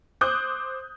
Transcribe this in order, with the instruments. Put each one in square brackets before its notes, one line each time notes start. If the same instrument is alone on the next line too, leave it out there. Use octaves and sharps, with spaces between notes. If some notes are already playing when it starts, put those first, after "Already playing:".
[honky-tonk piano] C5 D6 D#6 F#6 G6